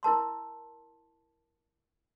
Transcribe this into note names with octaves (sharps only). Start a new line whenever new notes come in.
E4 A#4 A5 C6